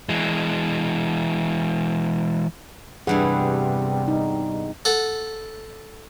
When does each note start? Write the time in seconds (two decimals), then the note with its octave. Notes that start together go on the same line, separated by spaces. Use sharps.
0.09 E3 G#3
3.07 E2 G2 C3 G3 E4 G#4 F#5
4.08 D#4
4.85 A4 F#5